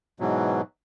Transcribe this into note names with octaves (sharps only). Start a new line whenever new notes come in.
G#2 B2 E3 F#3